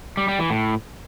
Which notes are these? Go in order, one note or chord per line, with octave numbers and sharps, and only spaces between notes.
G3
G3
E3
A2